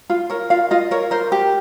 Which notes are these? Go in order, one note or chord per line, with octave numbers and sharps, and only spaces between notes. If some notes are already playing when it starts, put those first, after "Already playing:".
F4 F5
A#4 C#5
F4 F5
F4 D#5
A#4 C#5
A#4 C5
G4